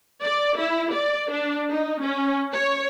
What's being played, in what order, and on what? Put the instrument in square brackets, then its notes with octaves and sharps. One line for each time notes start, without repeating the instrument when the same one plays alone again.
[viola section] D5
E4
D5
D4
D#4
C#4
C#5